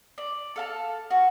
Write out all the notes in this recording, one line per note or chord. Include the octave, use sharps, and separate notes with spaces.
D5
A4 F5 A5
F#4